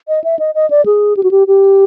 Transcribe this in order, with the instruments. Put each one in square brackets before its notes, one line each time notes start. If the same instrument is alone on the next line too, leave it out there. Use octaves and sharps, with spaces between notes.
[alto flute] D#5
E5
D#5
D#5
D5
G#4
G4
F#4
G4
G4